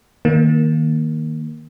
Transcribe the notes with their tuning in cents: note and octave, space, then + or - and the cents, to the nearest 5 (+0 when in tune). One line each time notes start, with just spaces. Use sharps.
D#3 +0 A#3 +0